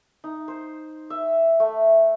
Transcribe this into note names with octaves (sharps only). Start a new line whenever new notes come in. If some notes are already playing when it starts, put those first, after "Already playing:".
D#4
C5
E5
A3